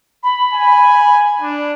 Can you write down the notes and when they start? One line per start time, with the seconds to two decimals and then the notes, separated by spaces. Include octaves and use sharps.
0.23 B5
0.53 G#5
1.42 D4